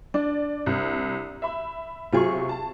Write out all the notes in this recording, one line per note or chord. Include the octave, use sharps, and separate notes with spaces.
D4 D5
C2
E5 B5
C3 F#3 F4 G#4 C#6
A5